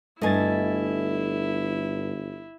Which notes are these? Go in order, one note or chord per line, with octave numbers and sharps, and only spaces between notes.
G1 G2 A3 E4 D#5 G#5 A6